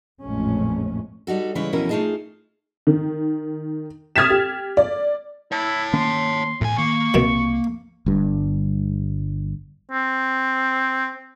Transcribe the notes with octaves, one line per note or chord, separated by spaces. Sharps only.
A1 F2 A#2 G#3 A3 C#4
G3 D#4 F#4 A4
C#3 E3 G#3 E4 B4 C#5
F2 B2 E3 C#4 E4 A#4
A3 D#4 F4 G#4 D#5 A5
D#3
D#6 F6 G#6 A6 B6 E7
G4
D5
E4 C#5 A5
D#3 A#3 C#4 C6
E2 A2 G#5
D#3 A#3 C#6
C2 B2 D#3 F#3 C4
G1 G2
C4